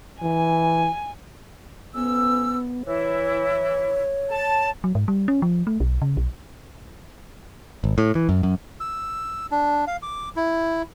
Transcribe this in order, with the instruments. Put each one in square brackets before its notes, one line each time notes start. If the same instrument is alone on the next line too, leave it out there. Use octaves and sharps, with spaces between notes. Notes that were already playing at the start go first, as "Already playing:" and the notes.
[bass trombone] E3 [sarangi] G#5
[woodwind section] F2 C#4 E6 [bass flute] B3
[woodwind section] E3 E4 [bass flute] C#5
[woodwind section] A5
[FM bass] F#3
G#2
G3
C#4
F3
A3
B1
C#3
B1
[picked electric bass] G#1
A2
E3
F#2
F#2
[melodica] E6
D4
F5
D6
E4